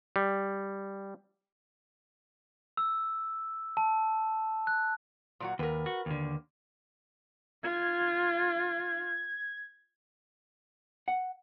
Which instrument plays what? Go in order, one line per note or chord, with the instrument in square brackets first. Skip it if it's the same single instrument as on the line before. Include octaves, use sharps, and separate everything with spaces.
[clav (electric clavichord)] G3
[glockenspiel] E6
A5
F#6
[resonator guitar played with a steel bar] A#2 F#3 F#4
[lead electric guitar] D#2 [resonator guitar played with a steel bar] A#4 B4
[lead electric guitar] F#4
D#2 D3
[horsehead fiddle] F4 [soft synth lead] G#6
[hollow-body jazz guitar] F#5